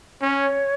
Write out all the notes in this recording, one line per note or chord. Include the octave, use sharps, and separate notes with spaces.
C#4 C#5